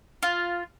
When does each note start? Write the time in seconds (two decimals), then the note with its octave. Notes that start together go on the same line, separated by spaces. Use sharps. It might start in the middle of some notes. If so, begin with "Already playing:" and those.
0.23 F4